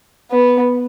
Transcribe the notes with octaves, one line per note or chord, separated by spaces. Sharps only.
B3